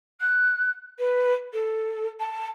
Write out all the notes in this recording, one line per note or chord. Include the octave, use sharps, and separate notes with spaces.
F#6
B4
A4
A5